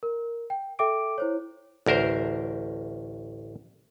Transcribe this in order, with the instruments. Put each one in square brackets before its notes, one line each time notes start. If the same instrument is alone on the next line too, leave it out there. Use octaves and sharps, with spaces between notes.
[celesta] A#4
G5
A4 E5 G5 D6 D7
E4 C5 C#5
[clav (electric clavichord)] A1 D2 A#4 C5